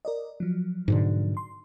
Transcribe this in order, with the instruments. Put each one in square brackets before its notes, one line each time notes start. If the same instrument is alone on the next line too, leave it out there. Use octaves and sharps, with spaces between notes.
[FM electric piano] A#4 D5 D#5
F3 F#3
[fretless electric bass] G#2 B2 D3
[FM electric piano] C6